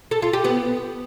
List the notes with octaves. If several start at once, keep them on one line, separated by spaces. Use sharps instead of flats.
A4
F4
G4
B3